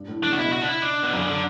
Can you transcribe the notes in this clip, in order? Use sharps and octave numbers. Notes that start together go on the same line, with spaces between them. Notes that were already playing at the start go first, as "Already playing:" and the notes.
Already playing: G2
A2
D3 D4
C#3
F#4
B2 E4
C#3
F#4
D4
E4
D4
B2
F#2 C#3
D3